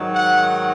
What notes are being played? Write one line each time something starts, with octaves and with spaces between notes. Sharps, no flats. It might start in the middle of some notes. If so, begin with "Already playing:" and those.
Already playing: G#2 D#3 F#3
F#5